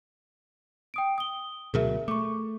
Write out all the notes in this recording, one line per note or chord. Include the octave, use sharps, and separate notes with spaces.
G5 D#6 D7
D#6 G7
D2 B2 F#3 G#4 A#4 E5
A3 C#6 D6